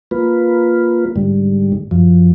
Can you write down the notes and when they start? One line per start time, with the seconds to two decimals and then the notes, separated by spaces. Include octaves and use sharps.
0.11 A#3 F4 B4
1.16 G#2 D3 G3
1.91 F#2 F3